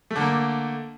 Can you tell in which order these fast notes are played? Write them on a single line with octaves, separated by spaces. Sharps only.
A3 D3 A#3